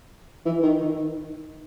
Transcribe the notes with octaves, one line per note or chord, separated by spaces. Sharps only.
E3
D#3
D#3